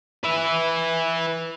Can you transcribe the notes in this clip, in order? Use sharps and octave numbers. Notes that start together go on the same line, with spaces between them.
B4 E5